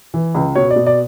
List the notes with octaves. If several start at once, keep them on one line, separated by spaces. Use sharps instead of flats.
E3
C#2
B2 C#5
D5
B2
D5